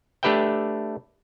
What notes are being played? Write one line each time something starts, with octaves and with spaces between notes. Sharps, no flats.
A3 D4 G4 B4 E5 G5